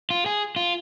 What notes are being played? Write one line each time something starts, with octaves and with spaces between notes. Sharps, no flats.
F4
G#4
F4